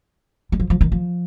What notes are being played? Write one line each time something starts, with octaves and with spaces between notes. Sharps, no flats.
G3
F3
F3
D#3
F3